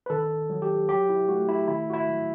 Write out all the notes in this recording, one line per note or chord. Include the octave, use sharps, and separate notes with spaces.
B4
D#3 A4
F#3
G4
F#3 G4
E4
A3 F#4
E4
D#3 E4
F#4
E4
F#3